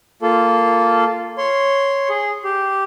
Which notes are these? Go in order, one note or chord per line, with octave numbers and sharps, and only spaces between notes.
A#3 F4 A4
C#5 C6
G#4
G4